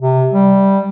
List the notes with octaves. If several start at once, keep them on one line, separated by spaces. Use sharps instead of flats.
C3
G3